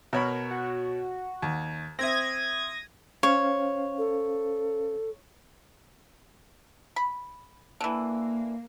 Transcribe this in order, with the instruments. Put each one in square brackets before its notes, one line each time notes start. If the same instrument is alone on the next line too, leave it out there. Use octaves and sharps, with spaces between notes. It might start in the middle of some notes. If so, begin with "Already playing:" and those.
[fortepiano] B2 C#5 B5 [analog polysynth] A#4
[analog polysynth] F#4
[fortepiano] D#2
[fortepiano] C4 E5 [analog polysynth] D#6 G#6 A#6
[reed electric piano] C#4 C5 F5 [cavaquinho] C#5
[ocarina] A4
[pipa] B5
[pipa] D3 E3 [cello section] A#3